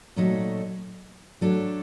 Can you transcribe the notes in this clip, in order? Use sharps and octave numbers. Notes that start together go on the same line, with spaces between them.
A#2 F#3 A3 D#4 A4
F#3 A3 D4 A4